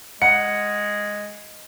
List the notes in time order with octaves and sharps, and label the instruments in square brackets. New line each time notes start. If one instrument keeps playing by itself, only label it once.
[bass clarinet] G#3 [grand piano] F#5 C#7